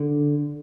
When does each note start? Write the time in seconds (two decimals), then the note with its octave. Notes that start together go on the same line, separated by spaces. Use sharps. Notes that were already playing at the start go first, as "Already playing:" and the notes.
Already playing: D3